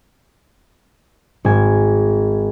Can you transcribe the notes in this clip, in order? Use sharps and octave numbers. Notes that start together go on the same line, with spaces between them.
G#1 G#5